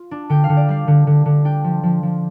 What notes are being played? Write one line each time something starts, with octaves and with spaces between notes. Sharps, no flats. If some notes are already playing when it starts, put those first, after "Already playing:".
Already playing: F4 F5
D4
D3 G5
F5
D3
D5
G3 F5
D3
D3
D3
D4 G5
F3
F3
F3